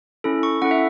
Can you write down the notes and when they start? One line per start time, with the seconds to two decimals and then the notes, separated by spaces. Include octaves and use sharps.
0.24 C#4 E4 A4
0.43 C#6
0.62 C#4 E4 A4 F#5
0.71 E5